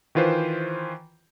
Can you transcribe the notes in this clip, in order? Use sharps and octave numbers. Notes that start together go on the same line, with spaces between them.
D#3 E3 F4 B4 C5